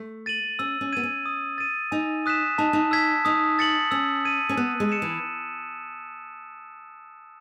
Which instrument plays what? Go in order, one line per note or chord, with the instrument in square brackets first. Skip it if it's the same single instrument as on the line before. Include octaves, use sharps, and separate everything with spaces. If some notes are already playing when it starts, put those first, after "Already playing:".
Already playing: [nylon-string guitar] A3
[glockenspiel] A6 D#7 F#7
[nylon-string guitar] C#4 [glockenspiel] E6
[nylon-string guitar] C#4
[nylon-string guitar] B3 [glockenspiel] G#6 D#7 F#7
[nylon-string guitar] C#4
[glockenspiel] D#6
A6 D#7
[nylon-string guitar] D#4 [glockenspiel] G#5
[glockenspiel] D#6 F#6 B6 E7
[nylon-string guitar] D#4 [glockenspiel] A5
[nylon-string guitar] D#4
[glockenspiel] E6 G#6 B6
[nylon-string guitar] D#4 [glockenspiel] D#6
[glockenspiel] A6 C#7 F#7
[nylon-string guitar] C#4 [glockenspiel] E6
[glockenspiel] G#6 D#7
[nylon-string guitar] C#4
[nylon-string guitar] B3 [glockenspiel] F#6
[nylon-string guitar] G#3
[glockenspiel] C#7 E7
[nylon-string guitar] E3